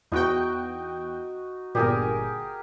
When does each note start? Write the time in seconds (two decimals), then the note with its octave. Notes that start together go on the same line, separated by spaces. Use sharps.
0.12 E2 D#4 F#4 G5 C#6
1.75 G1 A#2 G4 G#4 A#4